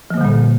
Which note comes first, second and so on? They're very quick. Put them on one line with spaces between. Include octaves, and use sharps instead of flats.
F3 A#3 D3 G3 A#2